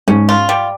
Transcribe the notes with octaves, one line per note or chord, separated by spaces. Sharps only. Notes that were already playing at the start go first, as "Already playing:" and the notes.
G#2 C#4
F4
G3